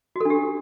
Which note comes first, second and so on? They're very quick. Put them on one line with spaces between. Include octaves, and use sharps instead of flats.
F#4 A4 D4 G4